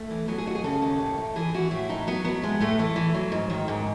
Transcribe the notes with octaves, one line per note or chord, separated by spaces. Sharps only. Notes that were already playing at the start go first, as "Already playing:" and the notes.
Already playing: A3
E3
F#3 B3
G#4
D#2 F#4
G#4
C#3 A4
D#2
A2
A2
E3 G#4
E3 F#4
A2 E4
A2 D#4
F#3 B3
F#3 B3
A2 G#3
A2 A3
E3 A3
E3
F#3
G#2
D#3
G#2